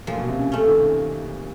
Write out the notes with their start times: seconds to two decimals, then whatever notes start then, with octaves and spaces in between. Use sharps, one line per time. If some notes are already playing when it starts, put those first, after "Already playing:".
0.07 A#2 F3
0.17 B2
0.28 C3
0.37 C#3
0.52 A3 C#4
0.67 D#3